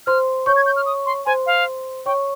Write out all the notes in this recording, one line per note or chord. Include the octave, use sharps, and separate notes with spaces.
C5 C6 F6
C#5 C#6 G6
G#6
G6
F6
D#6
C6
C5 G#5 C6
F5
C#5 G5 C#6